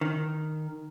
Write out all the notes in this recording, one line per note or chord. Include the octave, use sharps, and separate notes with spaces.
D#3